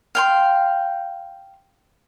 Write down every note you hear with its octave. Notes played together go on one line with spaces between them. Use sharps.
F5 G5 C6